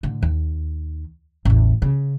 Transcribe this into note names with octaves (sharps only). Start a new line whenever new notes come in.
A2 D3
D#2
A1 E2
C#3